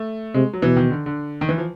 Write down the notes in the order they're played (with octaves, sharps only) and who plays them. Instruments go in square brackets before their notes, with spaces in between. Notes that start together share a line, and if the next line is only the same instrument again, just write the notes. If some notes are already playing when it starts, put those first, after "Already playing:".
Already playing: [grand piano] A3
[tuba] C3 [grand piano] G#3
[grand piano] F#3
[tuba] B2 [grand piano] E3
[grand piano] D#3
D3
D3
D#3
E3
F3